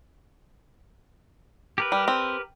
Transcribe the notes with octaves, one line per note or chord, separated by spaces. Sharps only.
G4 A#4 B4
G3
C4